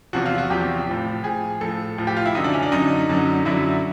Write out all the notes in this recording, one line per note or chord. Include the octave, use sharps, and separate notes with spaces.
E2 C3 F3 F#4
F4
F#4
E2 C3 F3 G4
A2 F3
A2 F3 G#4
A2 F3 A4
A2 F3
G4
F4
E4
F#2 D3 F#3 D#4
D4
C#4
D4
F#2 D3 F#3 D#4
F#2 D3 F#3
F#2 D3 F#3 E4